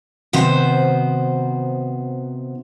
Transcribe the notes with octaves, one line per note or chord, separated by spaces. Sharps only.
C3 D#3 B3 F#4 C5